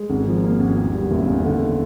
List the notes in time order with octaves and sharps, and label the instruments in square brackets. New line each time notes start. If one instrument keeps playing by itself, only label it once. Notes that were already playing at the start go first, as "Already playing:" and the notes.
Already playing: [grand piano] G#3
G#1
F3
A#3
G#1
E2
G3
F#1
E2
D3